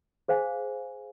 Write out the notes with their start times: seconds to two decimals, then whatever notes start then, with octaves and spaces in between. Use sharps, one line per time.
0.28 G#4 C5 F5 G#5